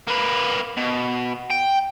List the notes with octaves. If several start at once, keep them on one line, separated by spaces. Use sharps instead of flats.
A#3 B4
B2
G5